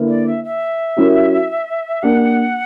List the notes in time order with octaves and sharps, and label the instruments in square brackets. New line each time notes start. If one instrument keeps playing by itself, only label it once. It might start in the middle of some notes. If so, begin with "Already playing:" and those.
Already playing: [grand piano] D3 A#3 E4 B4
[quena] D5
E5
E5
[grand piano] F#3 C#4 E4 G4 A#4
[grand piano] A#3 D4 G4 [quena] F#5